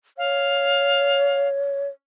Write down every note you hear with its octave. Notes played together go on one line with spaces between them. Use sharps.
C#5 F5